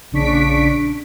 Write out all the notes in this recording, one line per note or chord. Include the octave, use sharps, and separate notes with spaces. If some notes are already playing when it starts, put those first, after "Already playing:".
A#1 C#3 D4 C#6 B6 D7